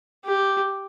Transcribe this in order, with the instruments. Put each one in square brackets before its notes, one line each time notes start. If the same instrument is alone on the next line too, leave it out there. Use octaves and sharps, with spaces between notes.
[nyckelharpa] G4